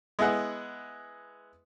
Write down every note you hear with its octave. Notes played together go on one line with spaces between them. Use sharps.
G#3 B3 E4 G#4 F#5